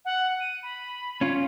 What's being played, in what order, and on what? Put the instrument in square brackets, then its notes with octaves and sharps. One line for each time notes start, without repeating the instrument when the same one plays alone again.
[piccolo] F#5
D#7
B5
[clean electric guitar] C#4 F4